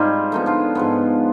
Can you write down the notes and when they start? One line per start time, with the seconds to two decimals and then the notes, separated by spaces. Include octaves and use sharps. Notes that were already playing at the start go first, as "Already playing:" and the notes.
Already playing: G#2 G3 C4 D#4 F4 G#4
0.32 D3 F3 B3 D#4
0.46 D4 F4
0.75 G#2 F3 B3